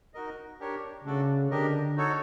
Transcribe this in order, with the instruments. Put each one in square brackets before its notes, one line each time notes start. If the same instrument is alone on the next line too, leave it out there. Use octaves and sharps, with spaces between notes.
[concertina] D#4 F#4 A#4 D#5
D4 G4 A#4 C#5
[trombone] C#3 [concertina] A3 D4 F#4 A4 D5
[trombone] D3 [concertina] D4 G4 A#4 D#5
[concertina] D#4 F#4 A4 C#5